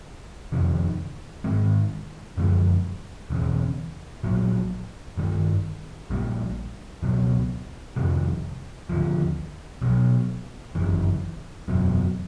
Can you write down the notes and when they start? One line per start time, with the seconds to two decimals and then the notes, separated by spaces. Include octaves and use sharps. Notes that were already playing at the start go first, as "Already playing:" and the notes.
0.52 F2 C3 D#3
1.44 G#2 D#3 G#3 C4
2.37 F#2 D3 F3 G#3
3.30 E1 E2 C#3
4.23 A#1 A#2 F#3
5.17 G2 D#3 G3
6.10 A#1 A#2 G3
7.03 C#2 B2 F#3
7.96 F2 C3 D#3 G3
8.89 D#2 D3 F3
9.82 B1 B2 F#3 B3
10.75 G1 F#2 C#3 E3
11.68 F#1 E2 B2 F#3